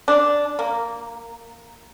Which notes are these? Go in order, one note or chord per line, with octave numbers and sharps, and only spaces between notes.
D4
A#3